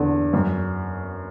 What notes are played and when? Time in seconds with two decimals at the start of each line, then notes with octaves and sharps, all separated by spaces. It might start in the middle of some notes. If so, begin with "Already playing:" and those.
Already playing: E2 D3
0.33 F#2